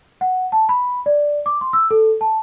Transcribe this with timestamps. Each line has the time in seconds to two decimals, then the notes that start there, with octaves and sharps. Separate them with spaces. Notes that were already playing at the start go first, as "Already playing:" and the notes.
0.21 F#5
0.52 A5
0.69 B5
1.06 D5
1.46 D6
1.61 C6
1.73 E6
1.91 A4
2.21 A5